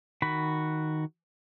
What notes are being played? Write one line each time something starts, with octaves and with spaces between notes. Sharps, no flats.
D#3 F#4 B5